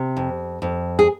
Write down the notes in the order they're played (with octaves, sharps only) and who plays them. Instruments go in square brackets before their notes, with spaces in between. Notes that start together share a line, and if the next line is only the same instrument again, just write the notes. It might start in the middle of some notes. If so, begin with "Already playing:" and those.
Already playing: [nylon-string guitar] C3
F2
F2
G#4